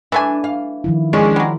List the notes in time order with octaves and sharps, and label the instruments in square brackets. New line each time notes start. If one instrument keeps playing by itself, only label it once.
[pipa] E3 A3 G#5 [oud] D4
[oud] F5
[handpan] D#3 F3 E4
[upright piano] G#3 G#4 [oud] C#4 D4
[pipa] F#3 G3